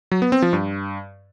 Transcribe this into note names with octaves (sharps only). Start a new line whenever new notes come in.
F#3
B3
C4
F3
G2